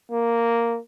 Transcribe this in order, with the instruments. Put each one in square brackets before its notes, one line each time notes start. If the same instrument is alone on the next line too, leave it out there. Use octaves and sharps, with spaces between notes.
[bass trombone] A#3